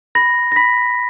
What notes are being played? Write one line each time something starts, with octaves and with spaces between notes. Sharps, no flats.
B5 A#6
A#6
B5 B6